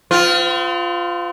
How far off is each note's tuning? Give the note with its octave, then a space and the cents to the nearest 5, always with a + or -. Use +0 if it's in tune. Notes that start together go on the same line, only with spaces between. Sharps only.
C4 -45 F4 +0